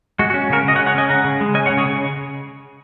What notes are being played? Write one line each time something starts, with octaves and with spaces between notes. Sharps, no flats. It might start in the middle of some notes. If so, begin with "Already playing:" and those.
G#3 F#4
F#4
C#4
C#3 F#4 A#4
C#3 D#5
C#5 F#5
G#3
C#5 F#5
C#4 D#5 G#5
C#3 F#5 A#5
C#3
G#3
C#4 D#5 G#5
C#5 F#5
C#3
G#4 C#5
C#3